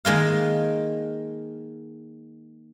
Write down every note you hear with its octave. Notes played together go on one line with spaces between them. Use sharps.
D#3 G#3 A#3 F5